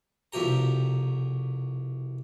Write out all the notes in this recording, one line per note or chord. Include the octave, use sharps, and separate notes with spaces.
C2 F2 B2 G4 A#5